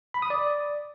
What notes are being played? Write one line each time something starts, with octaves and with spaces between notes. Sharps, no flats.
B5
D#6
D5